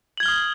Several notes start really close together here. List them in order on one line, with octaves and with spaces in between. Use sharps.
F#7 G#6 G7 F6 D#6